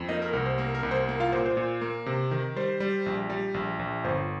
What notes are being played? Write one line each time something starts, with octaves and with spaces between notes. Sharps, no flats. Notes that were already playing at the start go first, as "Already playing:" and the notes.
Already playing: F2
A#3 D#4 D#5
A#4
C2 A#4
C5
A#3 A#4
A#4
C2
C5
A#3
F4 F5
A#2 C5
C5
A#2
A#3
C3
D#3
G3 C5
G3
A#1
G3
A#1
A#1
G1 C5